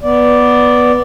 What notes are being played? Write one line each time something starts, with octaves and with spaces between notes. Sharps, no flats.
B3 D5